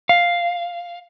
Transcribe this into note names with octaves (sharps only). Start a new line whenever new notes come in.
F5